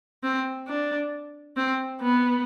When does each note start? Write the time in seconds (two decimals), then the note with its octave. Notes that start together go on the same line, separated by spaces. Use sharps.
0.23 C4
0.67 D4
1.57 C4
2.01 B3